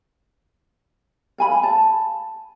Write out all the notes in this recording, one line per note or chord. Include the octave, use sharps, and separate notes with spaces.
F5 G#5 B5
A5